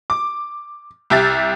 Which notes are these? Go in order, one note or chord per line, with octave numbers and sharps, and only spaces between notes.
D6
C2 G4 E5 A6